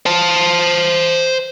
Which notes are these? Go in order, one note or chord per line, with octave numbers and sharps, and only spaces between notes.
C5 A5